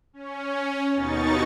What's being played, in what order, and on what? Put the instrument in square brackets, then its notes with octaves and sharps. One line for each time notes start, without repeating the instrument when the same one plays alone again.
[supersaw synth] C#4
D#2 B2 D#4 C#6 A6